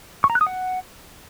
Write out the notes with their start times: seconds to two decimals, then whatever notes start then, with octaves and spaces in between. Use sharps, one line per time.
0.24 C#6
0.30 A#5
0.35 F#6
0.41 D#6
0.47 F#5